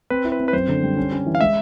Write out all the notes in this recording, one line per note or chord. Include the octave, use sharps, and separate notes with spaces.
C4 B4
E4
B4
C4
B4
F#2 C5
D3
G3
C#4
C#4
E3
F5
G#3 E5